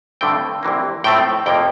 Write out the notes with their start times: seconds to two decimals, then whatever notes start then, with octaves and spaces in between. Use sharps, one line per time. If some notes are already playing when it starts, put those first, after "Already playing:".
0.21 G2 D3 A3 C4 G5
0.63 C2 C3 E3 A#3
1.04 A2 F3 A3 C4 G5
1.46 F2 C3 F3 A#3 G5